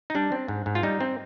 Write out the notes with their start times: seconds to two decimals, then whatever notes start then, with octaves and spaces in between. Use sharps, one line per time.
0.10 D#4
0.15 G3 D4
0.32 C4
0.48 G#2
0.66 G#2
0.75 F4
0.83 G3 D#4
1.01 C4